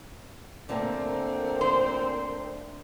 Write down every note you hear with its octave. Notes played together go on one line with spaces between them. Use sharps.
A#2 D3 A3 A#3 C4
C5